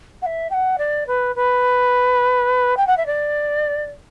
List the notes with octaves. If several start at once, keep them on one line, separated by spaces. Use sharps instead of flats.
F#5
E5
G5
F#5
D5
B4
B4
G5
F#5
E5
D5